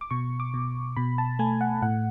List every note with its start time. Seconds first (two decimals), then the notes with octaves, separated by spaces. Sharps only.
0.01 D6
0.11 B2 C#6
0.40 D6
0.54 B2
0.96 B2 B5
1.18 A5
1.39 A3 G#5
1.61 F#5
1.82 A2 F#5